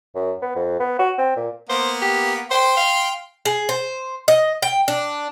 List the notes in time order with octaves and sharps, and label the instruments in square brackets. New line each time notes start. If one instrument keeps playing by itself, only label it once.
[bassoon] F#2
B3
F2
B3
F#4
C4
A#2
[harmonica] A#3 B3 [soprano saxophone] C5
[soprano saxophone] G4
[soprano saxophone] C5 [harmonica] G5 C6
[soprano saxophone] F5
[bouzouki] G#4
C5
D#5
G5
D4